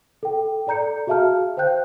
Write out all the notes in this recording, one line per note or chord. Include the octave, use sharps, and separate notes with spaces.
A4 G5
A4 D5 A#5 G6 C#7
F#4 G#4 E5 F5 A5 F6
C5 F5 G5 F#6 G6